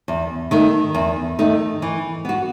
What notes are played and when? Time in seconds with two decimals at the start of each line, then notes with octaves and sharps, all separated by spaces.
0.08 E2
0.51 D#3 A3 D#4
0.94 E2
1.39 D#3 A3 D#4
1.82 E3
2.25 B3 F#4